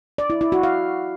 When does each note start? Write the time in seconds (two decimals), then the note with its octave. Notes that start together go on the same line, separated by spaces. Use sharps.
0.18 D5
0.30 E4
0.41 E4
0.52 F#4
0.63 F5